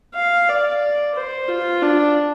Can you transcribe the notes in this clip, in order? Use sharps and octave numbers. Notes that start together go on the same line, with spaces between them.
F5
D5
C5
F4
D4